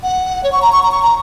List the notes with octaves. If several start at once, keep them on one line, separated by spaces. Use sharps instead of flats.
F#5
C#5
C#6
A#5
C#6
A#5
C#6
A#5